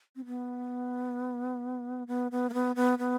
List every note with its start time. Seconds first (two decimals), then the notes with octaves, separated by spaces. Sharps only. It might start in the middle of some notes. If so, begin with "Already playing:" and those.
0.16 C4
0.26 B3
2.08 B3
2.31 B3
2.50 A#3
2.54 B3
2.76 B3
2.99 B3